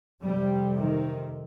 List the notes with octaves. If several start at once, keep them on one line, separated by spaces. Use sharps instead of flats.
F2 C3 G3
D#3